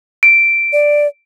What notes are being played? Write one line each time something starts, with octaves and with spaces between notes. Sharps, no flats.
D7
D5